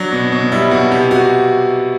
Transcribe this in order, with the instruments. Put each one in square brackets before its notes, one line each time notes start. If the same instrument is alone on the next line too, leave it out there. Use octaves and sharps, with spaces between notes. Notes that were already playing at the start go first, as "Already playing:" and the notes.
Already playing: [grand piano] F#3 D4
B2
B2
G3 E4
B2 F#4
C3 G4
C3 F#4